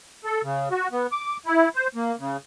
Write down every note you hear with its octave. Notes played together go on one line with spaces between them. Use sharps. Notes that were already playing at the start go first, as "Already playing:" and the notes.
A4
C#3
F#4
B3
D6
E4
C5
A#3
C#3